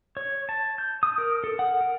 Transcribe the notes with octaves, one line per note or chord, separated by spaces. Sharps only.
C#5
A5
G6
D#6
A#4
A4
F#5
A#4